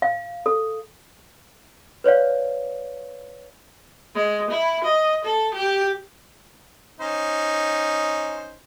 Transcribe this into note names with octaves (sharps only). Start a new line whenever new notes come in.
F5
A4
B4 C#5 D5 F5
G#3
E4
D#5
A4
G4
C#4 D#4 C5